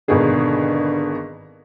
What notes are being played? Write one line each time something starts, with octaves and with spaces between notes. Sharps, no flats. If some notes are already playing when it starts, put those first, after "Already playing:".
G#1 B2 D3 G#4